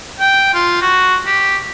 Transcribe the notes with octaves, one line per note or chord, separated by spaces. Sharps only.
G5
F4
F#4
G4